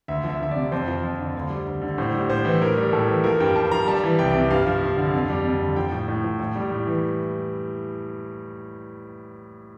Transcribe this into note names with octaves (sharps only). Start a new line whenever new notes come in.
D2 E5
F3
E5
D2 E5
C3 D5
F2 C5
F3
F2
D3
D2
G3
D2
D3
A2 C5
G3
A2 C5
E3
A2 A#4
G3
A2 A4
E3
F3 A#4
G2 G5
G2 A5
F3 A#5
G3 A5
E3
C2 G5
C3
G2 F5
F3
G2
D3
F2
G3
F2
D3
F3 G5
A2
A2
F3
A2
G3
A2
E3